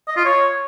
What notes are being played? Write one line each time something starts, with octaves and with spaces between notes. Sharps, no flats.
D#5
F4
C#5